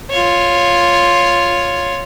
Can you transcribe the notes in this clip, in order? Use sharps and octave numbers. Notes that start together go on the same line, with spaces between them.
F4 C#5